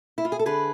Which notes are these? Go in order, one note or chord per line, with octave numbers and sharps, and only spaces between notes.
E4
F4
G#4
A4
D3 G#4 B4